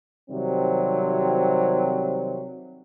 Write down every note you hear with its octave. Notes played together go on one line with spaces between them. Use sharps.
C3 D#3 F#3 G3 C4